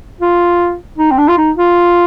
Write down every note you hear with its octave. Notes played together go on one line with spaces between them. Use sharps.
F4
D#4
C4
D4
F4
D#4
F4